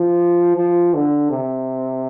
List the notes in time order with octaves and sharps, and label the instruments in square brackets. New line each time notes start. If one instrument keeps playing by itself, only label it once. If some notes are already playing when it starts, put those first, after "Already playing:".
Already playing: [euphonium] F3
F3
D3
C3